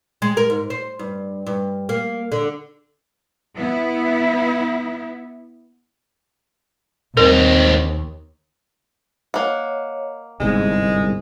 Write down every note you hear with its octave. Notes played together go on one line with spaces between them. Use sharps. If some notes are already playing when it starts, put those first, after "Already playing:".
G#3
A#4
G#2
C5
G2
G2
A#3
D3
B3 E4
D#2 C4 D#4 A#4
A#3 C#5 D#5 F#5
G1 C2 G#2 G#3 B3